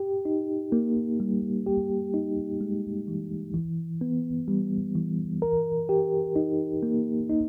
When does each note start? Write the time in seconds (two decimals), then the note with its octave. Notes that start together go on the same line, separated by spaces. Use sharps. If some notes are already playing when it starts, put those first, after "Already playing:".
Already playing: G4
0.25 D#4
0.72 A#3
1.20 G3
1.66 G4
2.14 D#4
2.61 G#3
3.08 E3
3.54 E3
4.01 B3
4.48 G3
4.95 E3
5.42 A#4
5.89 G4
6.36 D#4
6.83 A#3
7.29 D#4